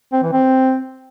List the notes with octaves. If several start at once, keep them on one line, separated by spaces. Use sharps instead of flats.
C4
E3
C4